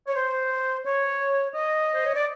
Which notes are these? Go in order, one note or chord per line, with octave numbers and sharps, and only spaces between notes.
C#5
C5
C#5
D#5
C5
C#5
D5